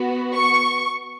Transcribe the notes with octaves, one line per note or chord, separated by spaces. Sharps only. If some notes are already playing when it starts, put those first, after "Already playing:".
Already playing: B3 F#4
C#6